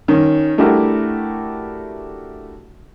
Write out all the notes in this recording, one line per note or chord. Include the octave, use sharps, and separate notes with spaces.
D#3 C#4
A3 D4 E4 F#4 G4 A#4